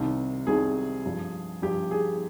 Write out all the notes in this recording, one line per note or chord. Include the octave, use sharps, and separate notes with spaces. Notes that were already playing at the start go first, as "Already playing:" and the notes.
Already playing: C2 C3 D#3
C2 C3 D#3 G#4
G2 F3
G2 F3 G4
G#4